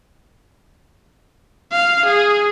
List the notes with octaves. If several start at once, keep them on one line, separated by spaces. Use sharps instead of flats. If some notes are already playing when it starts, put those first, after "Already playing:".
F5
G#4